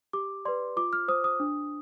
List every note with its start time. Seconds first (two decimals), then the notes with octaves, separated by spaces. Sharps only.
0.13 G4 D6
0.45 B4 D5 C6
0.77 F4 D6
0.93 F6
1.08 C5 D#6
1.24 D#6
1.40 D4